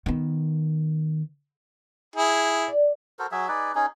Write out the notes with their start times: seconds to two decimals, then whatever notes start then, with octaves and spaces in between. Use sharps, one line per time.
0.06 D#3 B3
2.16 E4 G#4
2.68 D5
3.19 F#4 A4 A#4 C5
3.32 F#3 F#4 G#4 E5
3.48 D#4 G#4 B4 D5
3.75 C#4 D#4 G#4